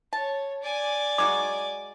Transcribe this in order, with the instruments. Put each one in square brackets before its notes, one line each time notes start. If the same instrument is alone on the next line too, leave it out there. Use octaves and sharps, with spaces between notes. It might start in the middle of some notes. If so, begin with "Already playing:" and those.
[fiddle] C#5 [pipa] A5
[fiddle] D5 G#5
[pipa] G#3 D#4 F#4 [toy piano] D6